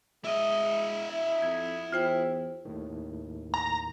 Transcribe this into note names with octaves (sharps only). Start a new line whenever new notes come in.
G#3 E4 D#5 E5 D#6
E5
F2 G#6
E2 F4 C5 G5
D#2 A2 D#3
A#5